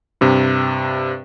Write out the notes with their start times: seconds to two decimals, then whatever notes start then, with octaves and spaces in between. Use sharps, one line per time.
0.21 G2 C3